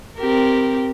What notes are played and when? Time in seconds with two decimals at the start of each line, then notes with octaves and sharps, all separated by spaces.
0.18 C4 G4 A#4